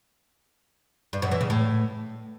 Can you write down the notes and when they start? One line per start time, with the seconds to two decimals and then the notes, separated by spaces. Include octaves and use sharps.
1.13 G2
1.22 F#2
1.31 E3
1.41 C#3
1.50 A2